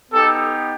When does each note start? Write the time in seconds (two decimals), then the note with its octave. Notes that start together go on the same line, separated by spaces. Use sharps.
0.11 B3 D#4 G4 A4